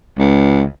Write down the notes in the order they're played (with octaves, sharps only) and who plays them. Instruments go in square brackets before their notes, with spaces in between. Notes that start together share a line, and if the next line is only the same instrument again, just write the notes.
[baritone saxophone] C#2